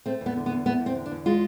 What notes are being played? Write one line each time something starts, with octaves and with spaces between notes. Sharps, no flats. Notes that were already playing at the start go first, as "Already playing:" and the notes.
A3 C4
E2
B3
D3
B3
E2
A3 B3
E2
C4
D3
D4
E2
G#3 F4